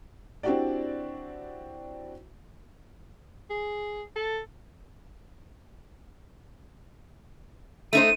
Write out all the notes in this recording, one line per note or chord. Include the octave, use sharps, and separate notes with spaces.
C4 D4 E4 F#4 G4 D5
G#4
A4
A3 D#4 C5 D#7